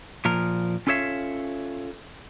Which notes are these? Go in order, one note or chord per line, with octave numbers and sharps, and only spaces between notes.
A#2 F3 A#4
C#4 F4 A4 C#5 E5 F5